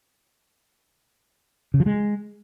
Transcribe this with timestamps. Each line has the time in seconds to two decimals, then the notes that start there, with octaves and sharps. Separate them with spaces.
1.74 C#3
1.80 F3
1.86 G#3